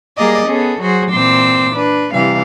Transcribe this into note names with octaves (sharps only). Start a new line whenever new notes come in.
G3 A#3 G#4 A#4 D5 D#5
B3 C#4 G#4 A4
F#3 F#4 G#4 C5
A#2 E3 C4 C5 D6 E6
D4 B4
C3 E3 G3 F5